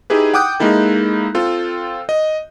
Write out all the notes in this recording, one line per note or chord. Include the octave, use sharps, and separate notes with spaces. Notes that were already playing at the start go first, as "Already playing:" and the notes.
D#4 E4 G4 G#4 B4
F#5 G5 D6 D#6 F#6 G6
G#3 A#3 D#4 E4 A4
C4 F4 A4
D#5